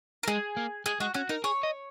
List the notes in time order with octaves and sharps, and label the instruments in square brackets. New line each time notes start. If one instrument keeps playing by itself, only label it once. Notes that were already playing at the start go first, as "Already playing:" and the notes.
[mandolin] A#4
[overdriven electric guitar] G#3 [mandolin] G#4
[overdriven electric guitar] A#3
[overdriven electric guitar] G#3 [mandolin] G#4
[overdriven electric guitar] G#3 [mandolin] F#4
[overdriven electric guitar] C#4 [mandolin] F#4
[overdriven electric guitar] D#4 [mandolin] A#4
[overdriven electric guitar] G#4 [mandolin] C#5
[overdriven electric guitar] D#5